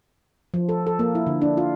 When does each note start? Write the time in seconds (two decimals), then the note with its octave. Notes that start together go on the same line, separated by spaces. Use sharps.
0.54 F3
0.69 A4
0.87 A4
0.99 A#3
1.15 E4
1.27 D3
1.42 D4
1.57 F4